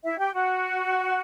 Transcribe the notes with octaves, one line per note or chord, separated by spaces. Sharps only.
E4 E5
G4 G5
F#4 F#5